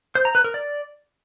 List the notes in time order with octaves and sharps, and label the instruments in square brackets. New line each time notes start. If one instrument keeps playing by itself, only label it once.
[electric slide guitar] C5
A#5
B4
A#4
D5